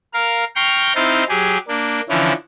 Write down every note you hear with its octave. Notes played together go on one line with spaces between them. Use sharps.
A#4 F5
G5 A#5 C6 C#6 F6
C4 D#4 E4 C6 F6 A6
F#3 G4 G#4
A#3 D4
D3 E3 F3 C#4 E4